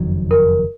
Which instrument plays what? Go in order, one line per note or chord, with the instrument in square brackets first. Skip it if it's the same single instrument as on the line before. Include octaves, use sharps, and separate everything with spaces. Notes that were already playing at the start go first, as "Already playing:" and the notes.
Already playing: [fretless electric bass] F#1 F2 D#3 F#3
[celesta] A#4